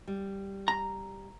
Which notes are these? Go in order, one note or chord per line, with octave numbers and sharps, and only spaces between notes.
G3
A#5